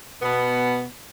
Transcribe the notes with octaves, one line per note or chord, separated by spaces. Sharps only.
B2 B3